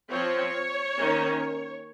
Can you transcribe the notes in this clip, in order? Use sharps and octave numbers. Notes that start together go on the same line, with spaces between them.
F3 C4 C#5
D#3 A#3 C#4